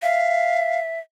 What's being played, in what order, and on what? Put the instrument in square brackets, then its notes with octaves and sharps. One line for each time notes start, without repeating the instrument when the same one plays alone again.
[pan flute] E5 [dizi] F5